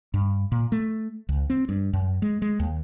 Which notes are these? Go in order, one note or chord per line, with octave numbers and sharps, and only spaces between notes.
G2
A#2
A3
C#2
C4
G2
F#2
G#3
G#3
D#2